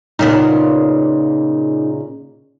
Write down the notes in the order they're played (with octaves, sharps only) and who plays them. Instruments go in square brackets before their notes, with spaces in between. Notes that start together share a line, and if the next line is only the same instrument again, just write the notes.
[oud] A#2 C#3 B3 [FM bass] D#4